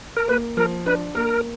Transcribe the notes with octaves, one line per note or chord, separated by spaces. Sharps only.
A#4
A#3 B4
F3 A#4
D4 B4
A#3 A#4